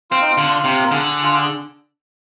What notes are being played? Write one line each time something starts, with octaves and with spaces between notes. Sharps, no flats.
C4 F4
D#4
F4
D3
C3
A#4
D3 G#4
F4